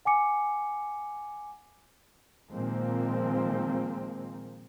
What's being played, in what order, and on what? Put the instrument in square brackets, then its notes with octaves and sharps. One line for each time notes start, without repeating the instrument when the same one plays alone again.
[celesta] F#5 G#5 D6 C#7
[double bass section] A#2 D#3 F3 G#3 A#3 C4